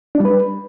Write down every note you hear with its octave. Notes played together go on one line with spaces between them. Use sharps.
D4
G3
B4